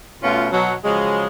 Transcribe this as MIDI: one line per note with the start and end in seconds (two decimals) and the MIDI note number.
0.22 0.47 47
0.22 0.47 57
0.22 0.47 59
0.22 0.47 61
0.22 0.47 65
0.51 0.73 47
0.51 0.73 54
0.84 1.27 49
0.84 1.27 53
0.84 1.27 54
0.84 1.27 56